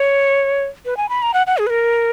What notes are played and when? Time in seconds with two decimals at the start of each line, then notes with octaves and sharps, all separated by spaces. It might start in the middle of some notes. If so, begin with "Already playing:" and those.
Already playing: C#5
0.85 B4
0.97 G#5
1.09 B5
1.22 A#5
1.34 F#5
1.47 F#5
1.58 G#4
1.66 B4
1.70 A#4